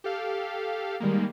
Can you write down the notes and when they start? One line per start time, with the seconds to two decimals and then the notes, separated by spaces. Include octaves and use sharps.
0.04 G4 A4 F5
1.00 D#3 G3 G#3 A#3